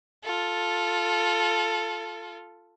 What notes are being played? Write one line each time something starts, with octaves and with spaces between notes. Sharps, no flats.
F4 A4